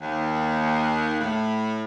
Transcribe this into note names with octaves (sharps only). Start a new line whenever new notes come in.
D#2
A2